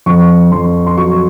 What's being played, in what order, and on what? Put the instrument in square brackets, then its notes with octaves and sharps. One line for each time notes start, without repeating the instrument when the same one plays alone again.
[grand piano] F2 C#6
F2 C6
C6
F#3 C#6